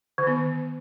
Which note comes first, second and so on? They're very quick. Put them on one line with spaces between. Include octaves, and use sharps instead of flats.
D3 D#3 B3